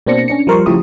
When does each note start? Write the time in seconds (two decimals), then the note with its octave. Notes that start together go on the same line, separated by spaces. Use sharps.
0.07 B2 A#3 C4 D4 A#6 C#7
0.28 C#4 D4 C#7
0.47 F3 G3 A#4 C5 C6 C#6
0.66 C#3 F3 A3 E4 G4 D#6